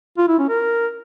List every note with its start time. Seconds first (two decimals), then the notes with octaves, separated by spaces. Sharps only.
0.18 F4
0.28 E4
0.39 C#4
0.49 A#4